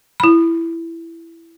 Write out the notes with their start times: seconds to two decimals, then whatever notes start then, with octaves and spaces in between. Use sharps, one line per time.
0.20 E4 B5